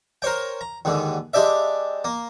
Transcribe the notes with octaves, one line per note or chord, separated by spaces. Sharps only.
A#4 C5 C#5 G5
A#5
D#2 G#2 D3
G#3 D4 G4 D5 E5
A#3